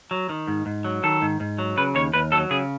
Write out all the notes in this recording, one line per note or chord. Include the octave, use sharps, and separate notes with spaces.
F#3
D#3
G#2
G#2
F#3
D#3 A4
G#2
G#2
F#3
C#3 B4
D#2 C#5
D#2 B4
F#3 A4
C#3 G#4